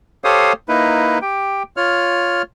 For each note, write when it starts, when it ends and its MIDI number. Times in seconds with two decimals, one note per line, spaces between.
0.24 0.53 67
0.24 0.53 69
0.24 0.53 72
0.24 0.53 73
0.24 0.53 77
0.24 0.53 87
0.69 1.18 58
0.69 1.18 63
0.69 1.18 64
0.69 1.18 71
1.22 1.63 67
1.22 1.63 79
1.77 2.42 65
1.77 2.42 73
1.77 2.42 89